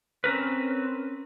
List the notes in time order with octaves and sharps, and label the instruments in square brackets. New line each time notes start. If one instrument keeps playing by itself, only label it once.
[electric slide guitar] C4 C#4 A#4 B4